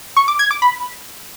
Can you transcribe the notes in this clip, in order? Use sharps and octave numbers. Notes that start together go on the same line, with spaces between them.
C#6
D6
G#6
D6
B5